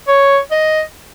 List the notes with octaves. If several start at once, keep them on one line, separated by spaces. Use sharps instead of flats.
C#5
D#5